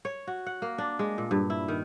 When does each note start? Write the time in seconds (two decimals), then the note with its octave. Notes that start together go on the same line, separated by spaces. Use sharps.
0.05 C#5
0.27 F#4
0.46 F#5
0.62 A#3
0.78 D4
0.99 G#3
1.18 A#2
1.31 G2
1.50 E4
1.68 D#3